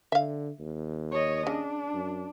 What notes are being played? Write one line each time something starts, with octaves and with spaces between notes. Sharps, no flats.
D3 E5 F5
D#2
C#5 D#5
C#3 D4
F#2